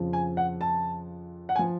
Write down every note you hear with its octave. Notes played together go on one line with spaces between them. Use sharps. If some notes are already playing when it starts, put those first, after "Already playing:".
Already playing: F2 C#3 F3
G#5
F#5
A5
F#5
G#5
F3